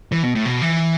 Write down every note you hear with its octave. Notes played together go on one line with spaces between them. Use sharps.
E3
B2
A2
B2
E3